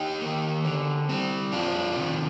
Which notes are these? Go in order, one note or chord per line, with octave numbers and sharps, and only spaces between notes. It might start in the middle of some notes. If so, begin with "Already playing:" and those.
Already playing: D#4 G4
D#3 A#3
D3
G3 C4
F2 D4 F4
C3 D#3